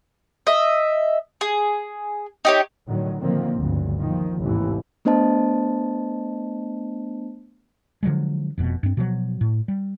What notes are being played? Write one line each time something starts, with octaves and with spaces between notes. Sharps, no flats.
D#5 E5
G#4
D#4 G4 C#5
A2 D3 D#3 F#3
A#2 D3 D#3 F3 A#3 C4
F#1 D2 G2
D#3 F3 A#3
A1 D#2 G#2 C3 E3
A3 B3 D4 C5 D#5 A5
D3 F3 F#3 G#3
F1 F2 B2
G2 C4
B2 F3 F#3
A2
G3